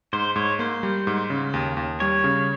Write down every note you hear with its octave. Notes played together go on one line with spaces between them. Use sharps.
G#2 C5
G#2 C#5
A#3 C5
G3
G#2
C#3
D#2
D#2
G3 C#5
C#3